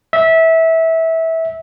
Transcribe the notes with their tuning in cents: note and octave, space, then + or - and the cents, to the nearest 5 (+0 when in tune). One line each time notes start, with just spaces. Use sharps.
E5 -20